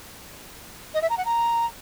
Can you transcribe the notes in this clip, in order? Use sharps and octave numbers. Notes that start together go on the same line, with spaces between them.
D#5
E5
A#5
F#5
A#5